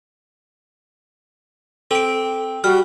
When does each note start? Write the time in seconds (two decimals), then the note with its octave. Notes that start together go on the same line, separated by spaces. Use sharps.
1.91 C4 A4 D7
2.64 G3 F#4 F6